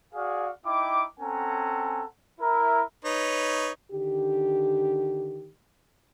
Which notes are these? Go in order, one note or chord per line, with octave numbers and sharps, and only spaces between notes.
F#4 G#4 D5 F5
D#4 E4 G5 D6
C4 C#4 A4 F#5 G#5 A#5
E4 A#4
D#4 B4 C#5
D3 D#3 G4